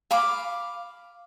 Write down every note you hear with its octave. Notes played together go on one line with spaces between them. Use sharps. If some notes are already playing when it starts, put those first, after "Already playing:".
F5 B5 D6